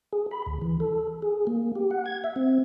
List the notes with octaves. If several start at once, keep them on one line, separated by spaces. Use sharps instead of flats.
G#4
B5
D2
E3
A4
G#4
A#3
G4
F#5
G#6
E5
C4